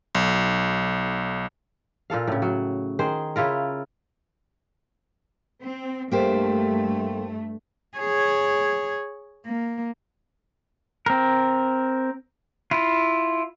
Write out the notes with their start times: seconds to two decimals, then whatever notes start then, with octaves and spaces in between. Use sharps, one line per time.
0.15 B1
2.10 A#2 F4 A4 F5
2.27 A2 C#3
2.42 F#3
2.99 D#3 G#4 C5
3.36 C#3 E4 F4 A#4
5.62 C4
6.12 G2 A3 A#3 G4 C5
7.98 G#4 C#5
9.46 A#3
11.06 C4 A#4
12.71 E4 F4